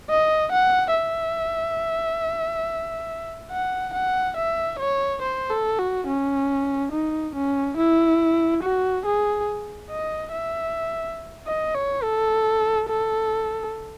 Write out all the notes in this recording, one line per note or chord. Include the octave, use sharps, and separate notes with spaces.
D#5
F#5
E5
F#5
F#5
E5
C#5
C5
A4
F#4
C#4
D#4
C#4
E4
F#4
G#4
D#5
E5
D#5
C#5
A4
A4